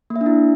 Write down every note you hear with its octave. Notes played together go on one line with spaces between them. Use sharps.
A#3
E5
D4
E4